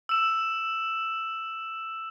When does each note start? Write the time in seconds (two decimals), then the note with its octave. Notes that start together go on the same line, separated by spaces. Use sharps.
0.09 E6 E7